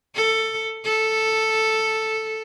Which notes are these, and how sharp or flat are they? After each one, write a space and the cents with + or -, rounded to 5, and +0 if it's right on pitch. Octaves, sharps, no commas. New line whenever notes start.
A4 +15
A4 +0